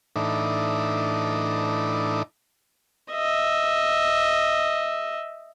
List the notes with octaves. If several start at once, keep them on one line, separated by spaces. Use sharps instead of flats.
A2 E3 D4 D#4
D#5 E5